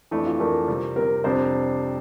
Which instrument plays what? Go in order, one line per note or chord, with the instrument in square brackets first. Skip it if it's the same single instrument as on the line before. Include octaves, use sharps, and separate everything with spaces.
[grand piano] F2 E3 A3 D4 [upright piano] E4
[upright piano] F4
[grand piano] F2 E3 A3 D4 [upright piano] A#4
[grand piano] C3 G3 C4
[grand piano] C3 G3 C4 [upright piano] A#4
[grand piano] F2 C3 G3 D4 [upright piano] C5